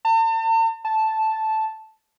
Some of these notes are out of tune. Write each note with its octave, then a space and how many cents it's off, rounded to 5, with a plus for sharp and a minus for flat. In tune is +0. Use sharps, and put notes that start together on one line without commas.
A5 +45
A5 -5